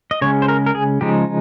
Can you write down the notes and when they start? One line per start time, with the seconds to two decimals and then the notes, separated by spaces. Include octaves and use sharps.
0.11 D#5
0.21 C#3 G#3 C#4 C#5
0.42 C5
0.48 A#4
0.66 A#4
0.75 G#4
1.01 C#3 F3 G#3 D#4 G4